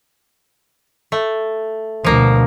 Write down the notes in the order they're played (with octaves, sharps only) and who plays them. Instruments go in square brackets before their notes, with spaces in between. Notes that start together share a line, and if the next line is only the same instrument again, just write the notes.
[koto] A3
[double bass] D2 B2 [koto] F3 A#3